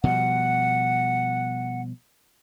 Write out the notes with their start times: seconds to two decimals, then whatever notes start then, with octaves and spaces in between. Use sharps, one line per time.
0.04 B2 F3 G3 F#5